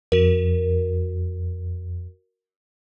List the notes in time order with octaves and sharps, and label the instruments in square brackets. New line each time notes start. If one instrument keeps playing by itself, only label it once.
[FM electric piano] F2 [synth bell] F#4 A#4